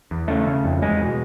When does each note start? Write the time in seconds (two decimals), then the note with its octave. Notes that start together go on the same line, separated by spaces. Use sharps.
0.11 E2
0.28 C#3 A3
0.47 C#3
0.65 F2
0.82 E2 G#3
1.01 B2